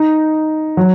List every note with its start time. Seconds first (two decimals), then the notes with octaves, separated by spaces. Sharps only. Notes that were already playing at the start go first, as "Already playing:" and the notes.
Already playing: D#4
0.77 F#3